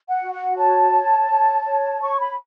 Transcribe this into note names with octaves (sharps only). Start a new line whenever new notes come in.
F#5
F#4
F#5
C#5 A5
C#5
C#5
C#5
C#5 C#6
B5